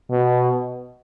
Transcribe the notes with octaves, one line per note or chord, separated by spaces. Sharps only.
B2